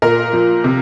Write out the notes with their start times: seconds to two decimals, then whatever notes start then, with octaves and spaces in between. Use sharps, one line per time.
0.02 A#2 A#4
0.33 F3
0.64 C3